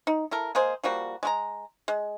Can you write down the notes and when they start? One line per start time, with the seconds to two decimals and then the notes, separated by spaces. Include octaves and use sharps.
0.07 D#4
0.31 E4 A4 A#4
0.55 G#3 A#3 G#4 C5
0.84 F3 G3 A#3 F#4
1.23 G#3 F#4 A#5
1.88 G#3